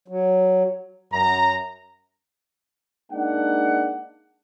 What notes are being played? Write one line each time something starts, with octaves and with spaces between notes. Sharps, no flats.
F#3
F#2 A#5
G#3 A#3 D4 D#4 D5 F#5